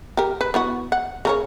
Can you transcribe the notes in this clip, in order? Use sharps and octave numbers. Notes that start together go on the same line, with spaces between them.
G4 A#4
B4
B3 E4 F#4
F#5
C#3 A#4 C#5